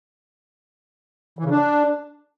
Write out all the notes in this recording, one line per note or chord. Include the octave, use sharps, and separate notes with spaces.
E3
C#3
D4